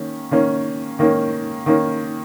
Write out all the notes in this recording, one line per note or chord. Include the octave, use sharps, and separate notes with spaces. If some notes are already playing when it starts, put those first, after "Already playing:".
Already playing: D#3 A#3 C#4
D#3 A#3 C#4
D#3 A#3 C#4
D#3 A#3 C#4